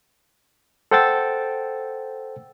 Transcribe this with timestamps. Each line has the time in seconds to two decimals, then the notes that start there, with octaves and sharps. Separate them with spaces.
0.91 A4 C5 F#5 G5 E6 A6